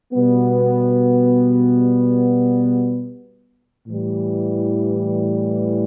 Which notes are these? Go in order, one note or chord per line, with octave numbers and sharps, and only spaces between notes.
B2 G3 B3
A2 E3 G3